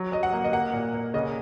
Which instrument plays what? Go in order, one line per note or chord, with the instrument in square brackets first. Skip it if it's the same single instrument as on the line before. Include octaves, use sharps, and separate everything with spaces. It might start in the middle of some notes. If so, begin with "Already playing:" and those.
Already playing: [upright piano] F#3
F#3 D#5
F#5
A#3
D#5
A#3 F#5
A#2
A#3
C#3 D#5